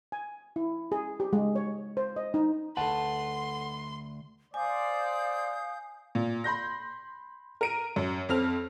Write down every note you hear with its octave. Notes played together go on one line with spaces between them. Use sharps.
G#5
E4
G#4
G4
G#3
C#5
C5
D#5
D#4
D2 A4 B4 F#5 A5 C6
C5 D5 F5 G#5 D#6 G6
A#2
B5 C6 G6 A#6
A#4 D7 D#7
F#2
F2 C4 F6 F7